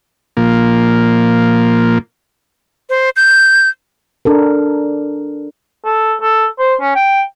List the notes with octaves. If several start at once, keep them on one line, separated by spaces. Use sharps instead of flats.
A#2 F3 A#3
C5
G6
D4 A4 A#4
A4
A4
C5
C#4
G5